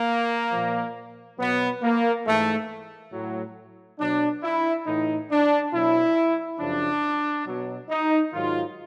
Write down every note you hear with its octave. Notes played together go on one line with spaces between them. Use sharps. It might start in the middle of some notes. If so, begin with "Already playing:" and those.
Already playing: A#3
A#2 F3
B2 F#3 B3
A#3
G#2 E3 A3
A2 F#3
B2 F#3 D4
E4
A2 E3 D#4
D4
B2 F#3 E4
F#2 C#3 F3 D4
B2 F#3
D#4
G#2 D#3 F#3 F4